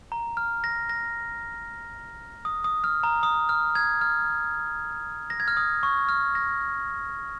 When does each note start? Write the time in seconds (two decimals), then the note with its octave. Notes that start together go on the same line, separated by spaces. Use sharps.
0.12 A#5
0.37 F6
0.64 A#6
0.89 A#6
2.45 D#6
2.64 D#6
2.84 F6
3.03 A#5
3.23 D#6
3.49 F6
3.75 G#6
4.01 F6
5.30 A#6
5.40 G#6
5.48 F6
5.57 D#6
5.83 C#6
6.09 F6
6.35 A#6